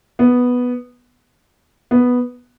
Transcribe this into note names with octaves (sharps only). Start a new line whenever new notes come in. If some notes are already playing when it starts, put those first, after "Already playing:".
B3
B3